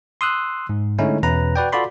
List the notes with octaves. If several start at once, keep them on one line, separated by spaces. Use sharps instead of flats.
C6 D#6 E6 F#6
G#2
D3 G#3 A3 C#4 D#4 E4
E2 B2 C#4 B4 A#5
F#4 B4 D5 G5
F4 F#4 A4 D5 B5 C6